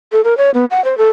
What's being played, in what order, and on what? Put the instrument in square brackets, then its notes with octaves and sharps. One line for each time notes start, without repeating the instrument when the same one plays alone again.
[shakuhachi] A4
A#4
C#5
B3
F#5
C5
A4